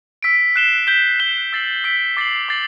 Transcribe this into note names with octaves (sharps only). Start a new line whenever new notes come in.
E6 B6 D7
F#6 C7 E7 G7
G6 B6 E7 G7
F#6 C7 E7 G7
E6 A6 C7 F#7
E6 B6 D7
D6 A6 C7 F#7
D6 A6 C7 F#7